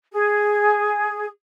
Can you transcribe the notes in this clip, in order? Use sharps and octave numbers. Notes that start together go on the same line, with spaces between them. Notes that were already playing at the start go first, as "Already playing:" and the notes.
G#4